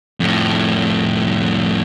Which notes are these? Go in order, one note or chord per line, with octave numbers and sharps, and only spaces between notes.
F2 A2